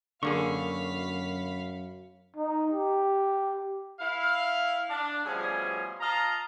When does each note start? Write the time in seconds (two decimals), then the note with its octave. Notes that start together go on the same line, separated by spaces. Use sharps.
0.23 F#2 D3 A#3 G#4 F5 B5 C#6
2.36 D#4
2.72 G4
4.00 E4 F5
4.89 D4
5.24 B2 F3 G3 A3 C#4 G#4
6.00 F4 D#5 F5 A5 A#5